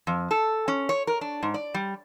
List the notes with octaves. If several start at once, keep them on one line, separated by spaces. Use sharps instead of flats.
F2
A4
C#4
C#5
A#4
D4
G#2
D5
G3